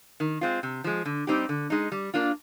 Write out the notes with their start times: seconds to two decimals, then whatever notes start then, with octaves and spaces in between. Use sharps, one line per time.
0.20 D#3
0.41 G#3 C4 F4
0.63 C3
0.84 F3 G#3
1.05 D3
1.27 G3 C4 D#4 G4
1.49 D3
1.70 G#3 D#4
1.92 G3
2.14 A#3 D4 F4